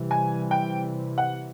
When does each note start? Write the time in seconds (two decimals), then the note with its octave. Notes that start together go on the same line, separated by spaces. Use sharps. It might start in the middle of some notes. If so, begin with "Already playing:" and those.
Already playing: C3 E3 G3
0.11 G#5
0.51 G5
1.18 F#5